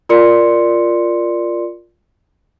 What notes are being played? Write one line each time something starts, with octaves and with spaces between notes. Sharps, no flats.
F4 A#4 D5 C6 C#7